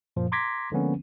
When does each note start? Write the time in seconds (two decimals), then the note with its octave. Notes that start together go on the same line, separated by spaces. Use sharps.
0.16 F#2 A#2 F3
0.32 A#5 C6 D6 G#6 A#6 B6
0.72 D3 F3 G#3 A#3 B3 C#4